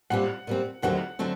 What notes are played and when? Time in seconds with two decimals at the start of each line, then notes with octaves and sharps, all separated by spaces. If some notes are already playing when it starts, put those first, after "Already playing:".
0.10 A#2 G3 C4 F#5
0.47 A#2 G3 C4
0.82 D#2 D3 F#3 A3 C4 F#5
1.19 D3 F#3 A3 C4